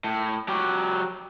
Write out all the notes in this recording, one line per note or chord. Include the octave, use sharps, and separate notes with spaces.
A2
F#3 G4